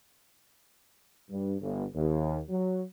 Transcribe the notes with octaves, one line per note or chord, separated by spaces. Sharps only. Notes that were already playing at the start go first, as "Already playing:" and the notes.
G2
G1
D#2
F#3